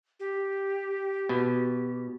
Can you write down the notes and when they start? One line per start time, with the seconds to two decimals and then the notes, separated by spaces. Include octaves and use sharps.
0.20 G4
1.29 B2